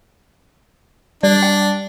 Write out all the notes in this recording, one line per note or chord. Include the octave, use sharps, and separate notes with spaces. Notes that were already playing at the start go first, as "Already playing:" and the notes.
G3 D4 D5
G5